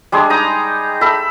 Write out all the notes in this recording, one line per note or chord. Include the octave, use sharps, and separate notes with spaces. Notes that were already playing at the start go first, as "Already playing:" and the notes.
G3 G#3 D4 G#4
D#4 A#5 D#6
A4 E5 B5